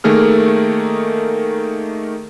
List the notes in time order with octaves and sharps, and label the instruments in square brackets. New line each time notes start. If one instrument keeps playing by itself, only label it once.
[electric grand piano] D#3 A3 A#3 G#4 F6